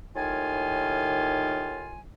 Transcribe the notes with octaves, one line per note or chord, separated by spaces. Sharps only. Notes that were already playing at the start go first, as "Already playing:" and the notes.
D#2 A2 D#3 F4 G#5